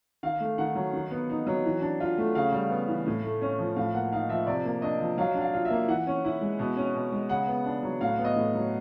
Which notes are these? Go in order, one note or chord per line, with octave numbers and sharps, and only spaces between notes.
D#3 F5
A3
D#3 F#5
F#3
D#3
B3
D#4
F#3
E3
D4
F4
A3
C#3 F5
G3
B3
E3
A2
A3
C#4
F3
A2 F5
A#3 F#5
D#4 F5
F3 E5
C3 D5
A#3
D4 D#5
F3
F#3 F5
D4
F5
F4
E5
A#3
E3 F#5
C#4
E4
G#3
B2
C#4
B2
G#3
C#3 F#5
B3
D4
F#3
A2 F5
B3
D#5
A2
F#3